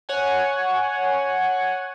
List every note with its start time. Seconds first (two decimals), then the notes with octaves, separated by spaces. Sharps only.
0.09 C#5 F#5 G#5